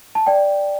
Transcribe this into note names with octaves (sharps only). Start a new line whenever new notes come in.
A5
D5 G5